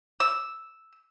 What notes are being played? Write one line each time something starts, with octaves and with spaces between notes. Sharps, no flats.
E6